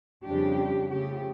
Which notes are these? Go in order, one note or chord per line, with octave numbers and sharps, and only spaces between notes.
F2 C#3 G3 D4 G4
C#3 F3 A3 C#4 G4